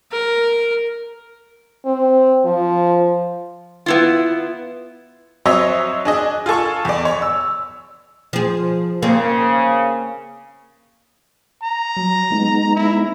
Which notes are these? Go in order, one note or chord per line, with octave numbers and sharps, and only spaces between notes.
A#4
C4
F3
B3 E4 F4
F#3 C4 C#5 D#5 E5
D4 G#4 D#5
F4 G#4 A4 C#6
E2 D5
C#5
E6
F3 G#4
C#3 A#3 C4
A#5
F#3
G#3 B3 D#4
E4